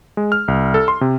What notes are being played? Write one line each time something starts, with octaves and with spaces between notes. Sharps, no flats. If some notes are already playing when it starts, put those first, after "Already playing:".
G#3
F6
C2
A4
C6
C3